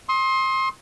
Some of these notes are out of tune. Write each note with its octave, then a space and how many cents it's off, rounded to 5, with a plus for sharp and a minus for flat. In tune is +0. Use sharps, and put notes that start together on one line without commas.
C6 +25 D#6 +35